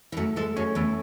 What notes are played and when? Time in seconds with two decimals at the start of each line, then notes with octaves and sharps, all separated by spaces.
0.12 E3
0.17 F#2 F#3 A3
0.36 G#2 G#3 A4
0.56 F#2 F#3 C#4
0.75 E2 E3 A3